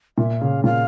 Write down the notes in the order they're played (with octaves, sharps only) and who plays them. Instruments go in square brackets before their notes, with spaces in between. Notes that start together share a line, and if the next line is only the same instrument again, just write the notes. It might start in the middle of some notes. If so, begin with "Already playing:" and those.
[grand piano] A#2 [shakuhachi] E5
[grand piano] C#3 [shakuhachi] F5
[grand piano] A#2 [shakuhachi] F5